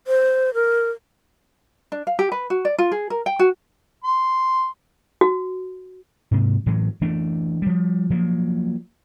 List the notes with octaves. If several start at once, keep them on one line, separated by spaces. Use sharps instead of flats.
C5
A#4
D4
F5
G4
B4
F#4
D5
F4
G#4
A#4
G5
F#4
C6
F#4
G#2 C3
A2 E3 F#3
E3 A3 D4
F3 G3
F3 F#3 A#3